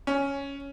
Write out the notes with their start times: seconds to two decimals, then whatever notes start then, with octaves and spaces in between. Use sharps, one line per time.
0.07 C#4